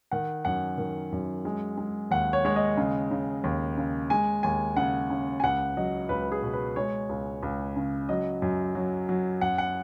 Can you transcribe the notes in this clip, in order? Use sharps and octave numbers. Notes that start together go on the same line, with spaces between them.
D#3 F#5
F#2 F#5
D#3
F#2
G#3
G#3
D#2 F#5
C#5
G#3 C#5
D#5
C#3
C#3
D#2
C#3
G#3 G#5
D#2 G#5
C#3 F#5
C#3
G#5
C#2 F#5
F#3 D#5
C#2 B4
G#4
B2
B4
G#3 C#5
C#2
C#2
C#3
F#3 D#5
F#2
F#3
F#3
F#2 F#5
F#5